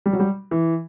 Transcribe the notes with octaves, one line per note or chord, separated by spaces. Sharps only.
G3
F#3
G3
E3